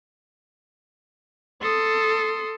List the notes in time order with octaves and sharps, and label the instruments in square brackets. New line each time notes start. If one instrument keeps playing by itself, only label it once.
[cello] A4 [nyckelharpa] C6 D#6